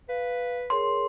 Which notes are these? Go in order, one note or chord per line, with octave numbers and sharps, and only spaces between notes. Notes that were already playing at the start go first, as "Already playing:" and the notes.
B4 F5
G#4 A#4 C#5 C6